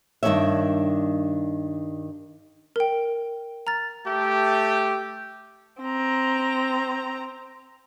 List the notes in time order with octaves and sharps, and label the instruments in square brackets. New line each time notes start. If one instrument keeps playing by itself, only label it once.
[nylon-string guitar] G2 D#3 C#4 D4 C#5 E5
[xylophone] A#4 G5
A#5 F6 A6
[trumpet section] A3 G4
[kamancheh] C4 A#5